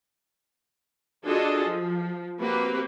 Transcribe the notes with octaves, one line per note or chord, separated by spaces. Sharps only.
D4 F4 F#4 G#4 A4 D#5
F3
A#3 C4 F#4 G4 B4